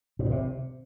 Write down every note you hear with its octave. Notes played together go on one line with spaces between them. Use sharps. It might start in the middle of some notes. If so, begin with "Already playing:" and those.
A#2
A2
C3